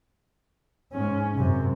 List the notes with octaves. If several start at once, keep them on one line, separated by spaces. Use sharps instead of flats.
G#2 C#4
F#2 C3